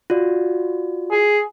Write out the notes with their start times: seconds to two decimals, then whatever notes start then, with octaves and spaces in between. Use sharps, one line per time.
0.10 F4 F#4 D5
1.12 G#4